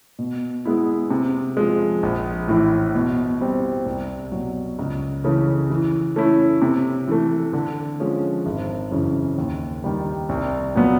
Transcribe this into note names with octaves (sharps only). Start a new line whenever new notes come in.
B2
G#3 B3 E4
C3
F3 G#3
A#1
A2 E3
B2
G3 C4
C2
B2 F#3
C#2
C#3 E3 A3 C#4
E3
A3 C#4 E4
C3
E3 A3
D3
F3 G#3 C#4
G#1
F#2 C#3 E3
D#2
D#3 G3
C2
A#2 F#3 B3